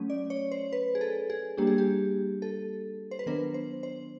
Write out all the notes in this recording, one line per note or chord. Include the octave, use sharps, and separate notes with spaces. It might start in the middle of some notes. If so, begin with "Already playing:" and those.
Already playing: F#3 A3 C#4
D5
C#5
C5
B4
G#4
A4
G#4
G3 A#3 D4 G4
G#4
G4
A4
C5
B4
D#3 F#3 B3 D4 A#4
C5
C5